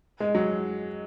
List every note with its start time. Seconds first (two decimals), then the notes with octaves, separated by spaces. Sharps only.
0.20 G#3
0.35 F#3